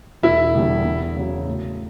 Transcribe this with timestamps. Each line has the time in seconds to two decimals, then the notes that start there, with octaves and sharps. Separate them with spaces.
0.23 E1 E4
0.55 E2 D3 G3
0.85 E2
1.16 C#3 F#3
1.47 A2